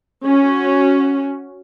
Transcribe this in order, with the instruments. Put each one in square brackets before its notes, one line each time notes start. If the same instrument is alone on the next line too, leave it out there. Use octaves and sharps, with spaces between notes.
[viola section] C#4 F#4